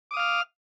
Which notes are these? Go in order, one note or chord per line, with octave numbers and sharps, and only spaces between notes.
F5 D6 D#6 F6